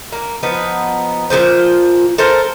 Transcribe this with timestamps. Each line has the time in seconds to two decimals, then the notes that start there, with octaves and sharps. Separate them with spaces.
0.12 A#3
0.43 F3 B3 D#4
1.30 A#2 C#3 F3 C5
2.18 A4 A#4 C5 F5